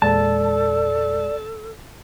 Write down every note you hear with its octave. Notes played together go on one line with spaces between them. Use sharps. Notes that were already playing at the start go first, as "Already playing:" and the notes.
E2 A#2 G#3 A4 D5 A5